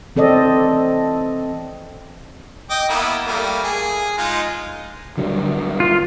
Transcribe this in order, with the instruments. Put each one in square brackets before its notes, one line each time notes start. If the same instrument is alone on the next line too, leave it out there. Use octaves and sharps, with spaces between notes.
[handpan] E3 C4 A4 D5 D#5
[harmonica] D#5 G5 D6
A#3 B3 E4
G3 A3 A#3
G#4
G#3 D#4 F4
[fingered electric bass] D3 F#3 G3
[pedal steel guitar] F4